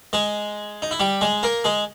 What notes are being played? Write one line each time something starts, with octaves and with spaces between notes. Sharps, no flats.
G#3 G#4
D#4
E4
G3 G4
G#3 G#4
A#3 A#4
G#3 G#4